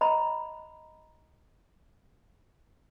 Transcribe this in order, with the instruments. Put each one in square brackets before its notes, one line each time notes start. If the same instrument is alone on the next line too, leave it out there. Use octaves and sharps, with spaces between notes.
[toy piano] D#5 A#5 B5